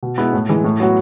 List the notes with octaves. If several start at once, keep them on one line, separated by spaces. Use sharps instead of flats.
B2
G#3 B3 E4
A2
E3 G#3
A2
F#3 B3 F#4